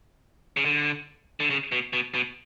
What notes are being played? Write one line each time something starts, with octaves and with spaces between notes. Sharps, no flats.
C#3
D3
D3
C#3
B2
B2
B2